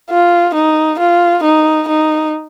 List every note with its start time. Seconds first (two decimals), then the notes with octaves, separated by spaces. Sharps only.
0.10 F4
0.55 D#4
0.99 F4
1.43 D#4
1.88 D#4